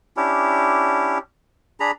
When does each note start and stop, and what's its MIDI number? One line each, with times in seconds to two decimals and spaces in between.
0.17 1.18 61
0.17 1.18 62
0.17 1.18 64
0.17 1.18 67
1.80 1.91 62
1.80 1.91 68
1.80 1.91 82
1.80 1.91 83